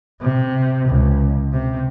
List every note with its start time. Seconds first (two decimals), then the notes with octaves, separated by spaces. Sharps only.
0.21 C3
0.89 C#2
1.52 C3